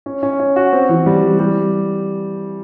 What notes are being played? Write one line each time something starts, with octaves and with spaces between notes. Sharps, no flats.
C#4
C#4
C#4
F#4
C4
E3
G3
E3
G3